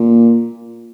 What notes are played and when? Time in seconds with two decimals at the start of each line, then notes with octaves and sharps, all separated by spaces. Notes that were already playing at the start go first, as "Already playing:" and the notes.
Already playing: A#2